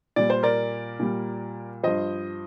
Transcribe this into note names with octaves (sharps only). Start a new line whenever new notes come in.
A#2 G3 D5
C5
A#4 D5
A#2 G3
G2 F3 C5 D#5